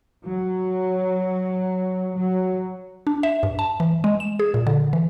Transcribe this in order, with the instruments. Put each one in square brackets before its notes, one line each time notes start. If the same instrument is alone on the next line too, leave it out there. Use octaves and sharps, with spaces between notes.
[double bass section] F#3
F#3
[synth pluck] D4
E5
G2
A5
E3
G#3
E7
G#4
A#2
D3
E3